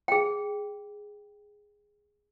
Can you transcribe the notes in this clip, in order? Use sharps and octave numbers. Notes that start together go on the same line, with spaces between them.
G#4 G5